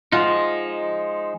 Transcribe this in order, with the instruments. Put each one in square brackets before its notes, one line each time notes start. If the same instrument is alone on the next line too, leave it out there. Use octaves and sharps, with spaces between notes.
[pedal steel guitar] F3 G#3 D#4 [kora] F4 F#5